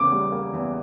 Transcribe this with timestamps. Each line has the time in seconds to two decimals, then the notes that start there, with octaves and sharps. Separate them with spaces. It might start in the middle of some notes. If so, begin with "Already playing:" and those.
Already playing: E2 C#3 A#3 D6
0.12 G3
0.32 A#3
0.53 E2